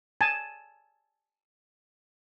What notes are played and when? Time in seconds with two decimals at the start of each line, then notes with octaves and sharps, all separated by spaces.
0.21 G#5 A5